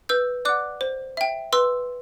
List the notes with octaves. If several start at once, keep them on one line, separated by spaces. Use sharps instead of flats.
B4 E6 G6
D5 F#5 D6 F#6
C5
E5 G5
B4 C6 E6